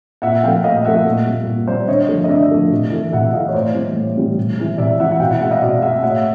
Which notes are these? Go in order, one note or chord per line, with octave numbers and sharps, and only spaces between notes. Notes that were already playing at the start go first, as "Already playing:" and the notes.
A#2 E5 F#5
F3 A3 F5 G5
A#2 D#5 F5
F3 A3 E5 F#5
A#2
G3
A#2
G3 C5 D5
D3 C#5 D#5
F3 A3
D#5
D3 D5 E5
F3 A3
C3
E3 A3
C3 E5 F#5
E3 A3 D#5 F5
C#5
A2 C5 D5
E3 G3
A2
E3 G3
C3
E3 G#3
C3 D5 E5
E3 G#3 E5 F#5
F#5
B2 F5 G5
E5 F#5
G#3 E5 F#5
D#5 F5
B2 D5 E5
F5
G#3 E5 F#5
A2 E5 F#5